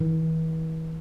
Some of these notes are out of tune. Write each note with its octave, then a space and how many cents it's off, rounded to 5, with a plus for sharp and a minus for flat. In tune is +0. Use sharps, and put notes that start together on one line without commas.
E3 -40